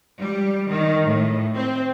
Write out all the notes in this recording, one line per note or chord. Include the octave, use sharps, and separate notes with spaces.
G3
D#3
A2
C4